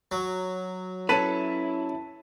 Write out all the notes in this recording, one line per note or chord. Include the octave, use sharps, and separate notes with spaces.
F#3
C#4 E4 A4 B4 A5 B6 D#7